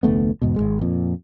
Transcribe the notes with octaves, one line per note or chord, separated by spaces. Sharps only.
F1 D2 A3 B3
E2 G#2 B2
G#1 C#2 G#3
F2 A#2